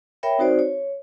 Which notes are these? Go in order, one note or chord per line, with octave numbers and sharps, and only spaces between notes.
A#4 C#5 E5 G5 B5
C4 D#4 F#4 C5 D5
C#5